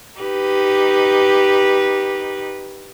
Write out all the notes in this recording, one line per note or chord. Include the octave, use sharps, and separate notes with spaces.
D#4 G4 B4